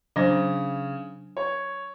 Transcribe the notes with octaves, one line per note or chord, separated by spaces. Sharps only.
C#3 F#3 D4 C5
C#5